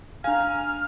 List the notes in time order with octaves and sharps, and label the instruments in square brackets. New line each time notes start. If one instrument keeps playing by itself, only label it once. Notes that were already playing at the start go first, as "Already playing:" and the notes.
[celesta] D4 F5 [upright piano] G#5 A#5 [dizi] F6